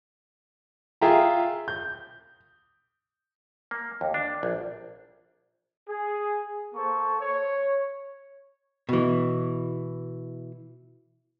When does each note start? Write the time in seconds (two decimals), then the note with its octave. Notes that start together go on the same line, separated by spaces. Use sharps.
1.01 F4 G#4 E5 G5 A#5
1.68 G6
3.71 A#3
4.01 D#2
4.14 D4
4.43 A#1
5.88 G#4
6.74 A#3 A4 C5 C#6
7.21 C#5
8.89 B2 E3